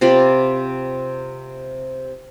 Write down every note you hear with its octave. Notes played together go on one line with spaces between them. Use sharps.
C3 F4 D5 B5